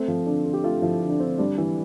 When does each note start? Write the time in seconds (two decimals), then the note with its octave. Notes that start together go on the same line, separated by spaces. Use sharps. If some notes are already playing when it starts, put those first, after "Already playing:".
Already playing: A3 C4
0.08 F3
0.26 D3 D4
0.46 D3
0.53 G4
0.64 A3 F4
0.82 F3 E4
1.01 D3
1.09 D4
1.20 D3 C4
1.38 G3 D4
1.58 E3